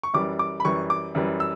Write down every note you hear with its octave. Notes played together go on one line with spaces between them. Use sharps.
C#6
F#2 E3 G3 D6
D6
B5
F#2 E3 G3 C#6
D6
F#2 E3 G3
E6